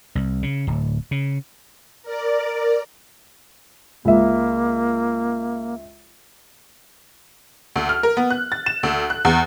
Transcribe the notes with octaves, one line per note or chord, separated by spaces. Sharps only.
C2
C#3
D1
C#3
A#4 D5
C#2 A#3 E5
D2
F6
A#4
B3
F#6
A6
E7
D2
F#6
E2